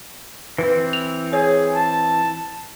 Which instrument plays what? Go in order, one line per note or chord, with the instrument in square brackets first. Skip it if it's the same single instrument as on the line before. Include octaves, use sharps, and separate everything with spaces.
[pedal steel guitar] E3 C4 [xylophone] B4
[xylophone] F7
[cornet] G#4 [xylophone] C#5
[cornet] A5